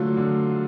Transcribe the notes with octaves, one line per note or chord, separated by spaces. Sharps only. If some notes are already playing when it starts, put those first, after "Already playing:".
Already playing: D3 F#3 A3 F4
D3